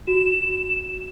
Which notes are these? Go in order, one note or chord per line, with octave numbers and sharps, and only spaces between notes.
F#4 E7